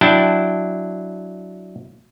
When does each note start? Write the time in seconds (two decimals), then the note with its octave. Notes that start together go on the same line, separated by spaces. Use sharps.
0.01 F#3 D4 E4 G5 A5